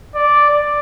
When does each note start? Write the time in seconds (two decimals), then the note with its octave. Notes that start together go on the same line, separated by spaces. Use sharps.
0.15 D5
0.50 D5